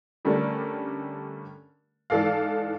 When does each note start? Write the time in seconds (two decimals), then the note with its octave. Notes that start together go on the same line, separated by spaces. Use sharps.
0.25 D3 G3 A3 C#4 A#4 D5
2.10 G#2 E3 A4 D5 F5